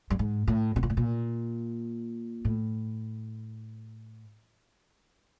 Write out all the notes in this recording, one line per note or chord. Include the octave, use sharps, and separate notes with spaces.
G2
G#2
A2
B2
A#2
A2
A#2
A2